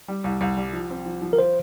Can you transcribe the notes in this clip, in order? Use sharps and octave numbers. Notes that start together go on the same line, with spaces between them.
G3
C2
C2
G3
F3
C4
F3
F3
A#4
F4 C5